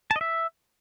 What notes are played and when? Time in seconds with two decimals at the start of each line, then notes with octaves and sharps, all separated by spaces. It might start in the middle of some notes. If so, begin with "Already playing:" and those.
0.11 A5
0.16 D#5
0.21 E5